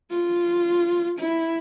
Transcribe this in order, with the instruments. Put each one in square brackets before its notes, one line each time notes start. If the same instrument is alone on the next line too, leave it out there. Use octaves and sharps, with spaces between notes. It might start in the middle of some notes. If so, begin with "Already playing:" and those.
[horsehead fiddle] F4
E4